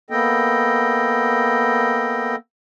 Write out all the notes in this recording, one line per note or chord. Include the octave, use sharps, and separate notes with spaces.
A#3 B3 A4 D#5 G5